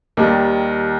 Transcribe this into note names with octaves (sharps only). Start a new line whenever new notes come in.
D#2 D#3 G3